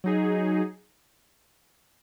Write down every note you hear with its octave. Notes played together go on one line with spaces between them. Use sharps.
F#3 D#4 G#4